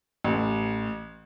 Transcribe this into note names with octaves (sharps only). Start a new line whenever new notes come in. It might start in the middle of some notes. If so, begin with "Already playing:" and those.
A1